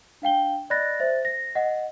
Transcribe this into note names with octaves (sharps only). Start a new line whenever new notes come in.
D4 F5 G5 G7
D5 D#5 B5 F#6 A6 A#6
C5 E5 A6
A#6
D#5 F#5